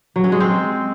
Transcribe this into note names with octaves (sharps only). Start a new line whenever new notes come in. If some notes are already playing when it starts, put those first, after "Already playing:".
F#3
C#4
G#3
C4